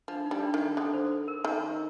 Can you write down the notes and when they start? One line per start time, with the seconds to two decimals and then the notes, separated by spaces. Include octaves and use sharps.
0.08 F3 D4
0.26 D#4
0.31 G3
0.42 D4
0.54 D#3
0.59 D#4
0.77 D3 A4
0.94 C5
1.28 A#4
1.44 D#3 A#4